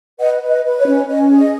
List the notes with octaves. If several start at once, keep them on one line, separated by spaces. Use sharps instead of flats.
B4 D#5 F#5
B4
D#5
B4
C#5
C#4
C#4 D#5
G#4
D#5